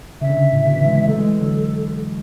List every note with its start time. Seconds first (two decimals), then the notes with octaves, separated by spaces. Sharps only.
0.21 C#3 E5
0.30 D3
0.37 C#3
0.45 D3
0.53 A2 C#3
0.65 B2 D3
0.75 C#3 E3
0.86 E3 G#3
0.97 E3 G#3
1.08 F#3 A3 A4
1.18 E3 G#3
1.29 E3 G#3
1.40 D3 F#3